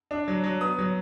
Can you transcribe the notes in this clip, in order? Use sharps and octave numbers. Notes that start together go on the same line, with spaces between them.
D4
F#3
F#3
B3 D#6
F#3